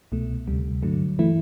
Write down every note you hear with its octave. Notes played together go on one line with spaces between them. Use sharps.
C2 B2 A3
D2 C3 G3
G2 D3 F#3 A3
E3 A3 E4